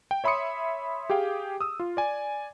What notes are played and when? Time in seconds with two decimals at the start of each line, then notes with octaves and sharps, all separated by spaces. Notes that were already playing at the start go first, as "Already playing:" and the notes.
0.11 G5
0.24 C#5 E5 B5 C6 D#6 C#7
1.10 G4 G#4 F5 G5
1.61 D#6 E6
1.80 F4
1.97 D5 G#5